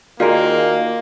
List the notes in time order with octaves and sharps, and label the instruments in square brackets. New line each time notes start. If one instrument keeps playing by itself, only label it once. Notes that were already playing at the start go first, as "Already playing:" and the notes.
[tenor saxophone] D#3 [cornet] A#3 [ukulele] F4 G#4 A#4 [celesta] F#4 D5 F5